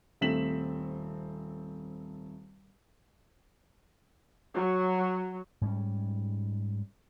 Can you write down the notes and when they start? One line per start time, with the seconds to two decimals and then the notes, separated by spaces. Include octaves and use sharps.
0.21 D#1 A3 C4 B6 E7 F#7
4.54 F#3
5.61 G#2 G3 C#4